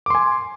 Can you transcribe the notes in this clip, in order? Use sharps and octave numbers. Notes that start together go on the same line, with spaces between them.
G#5 C6 D6